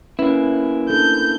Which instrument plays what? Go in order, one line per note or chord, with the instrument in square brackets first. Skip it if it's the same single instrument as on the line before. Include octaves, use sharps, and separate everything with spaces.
[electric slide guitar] A#3 E4 [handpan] C#4 B4
[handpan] D4 A4 [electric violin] G6